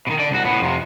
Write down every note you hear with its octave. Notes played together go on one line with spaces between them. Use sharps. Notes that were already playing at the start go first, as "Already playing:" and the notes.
B2 D#3
D3 D5
C2 F#4
A2 B3
F2 C3